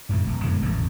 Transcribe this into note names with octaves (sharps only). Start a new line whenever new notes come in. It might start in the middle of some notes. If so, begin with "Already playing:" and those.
F#2 A2 D3
E1
F#2 D3 G#3 B3
E1 A1 C#3